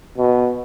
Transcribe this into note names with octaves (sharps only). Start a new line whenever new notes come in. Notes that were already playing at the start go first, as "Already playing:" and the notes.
B2